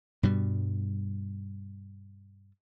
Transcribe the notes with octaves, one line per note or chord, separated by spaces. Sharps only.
G2 B2 G3